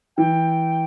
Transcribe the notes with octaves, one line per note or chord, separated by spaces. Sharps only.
E3 G5